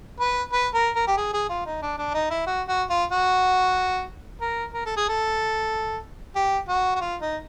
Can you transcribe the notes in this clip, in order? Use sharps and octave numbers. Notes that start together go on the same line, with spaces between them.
B4
B4
A#4
A#4
G4
G#4
G#4
F4
D#4
D4
D4
D#4
E4
F#4
F#4
F4
F#4
A#4
A#4
A4
G#4
A4
G4
F#4
F#4
F4
D#4